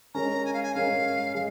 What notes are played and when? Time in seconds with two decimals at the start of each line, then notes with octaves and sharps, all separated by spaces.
0.14 G#3 C#4 A#4 A#5
0.45 G#5
0.53 F5
0.63 G#5
0.75 G#3 C#4 A#4 F5
1.35 G#3 F5